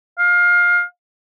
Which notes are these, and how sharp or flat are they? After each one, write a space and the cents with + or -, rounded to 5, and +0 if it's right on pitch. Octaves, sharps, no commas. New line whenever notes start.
F5 +20